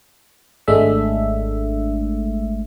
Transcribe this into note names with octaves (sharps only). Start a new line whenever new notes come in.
G#1 G#3 A3 D4 E5